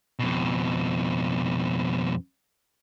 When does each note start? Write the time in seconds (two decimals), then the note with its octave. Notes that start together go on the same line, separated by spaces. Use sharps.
0.19 F2 B2